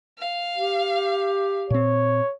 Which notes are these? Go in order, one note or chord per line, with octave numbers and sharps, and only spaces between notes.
F5
G4
A#2 C4 C#5